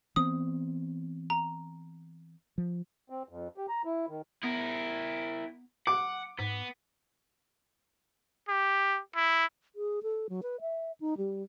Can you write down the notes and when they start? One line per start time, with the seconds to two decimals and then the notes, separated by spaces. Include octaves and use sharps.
0.16 E3 B3 C4 D#6
1.30 A#5
2.58 F3
3.10 C4
3.29 F2
3.58 G4
3.69 A#5
3.85 E4
4.08 D#3
4.43 B3 E4 A#4
5.87 F#5 D6
6.39 G#2 B3
8.49 G4
9.16 E4
9.75 G#4
10.03 A4
10.29 F#3
10.43 B4
10.61 E5
11.00 D#4
11.17 G3